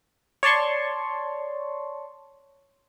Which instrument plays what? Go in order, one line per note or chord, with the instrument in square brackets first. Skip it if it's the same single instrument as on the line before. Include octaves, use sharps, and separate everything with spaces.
[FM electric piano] C#5 D5 A5 C6 C#6